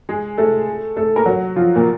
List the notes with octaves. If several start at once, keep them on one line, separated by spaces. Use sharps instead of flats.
G#3 G#4
A3 A4
A3 A4
A#3 A#4
F#3 F#4
F3 F4
A#2 A#3